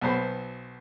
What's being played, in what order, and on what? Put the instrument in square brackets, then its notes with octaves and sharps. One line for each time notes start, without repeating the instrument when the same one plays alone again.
[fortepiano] B1 F#3 B3 C5 B5